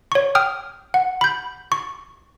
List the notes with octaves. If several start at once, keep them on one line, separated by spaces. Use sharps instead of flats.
C#5 C#6
G5 D#6 F6
F#5
B5 G6
C#6